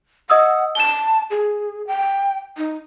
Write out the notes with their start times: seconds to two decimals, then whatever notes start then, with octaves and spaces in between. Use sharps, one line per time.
0.30 D#5 F#5 D#6 E6
0.75 A5 E7 G7
1.31 G#4
1.87 G5
2.57 D#4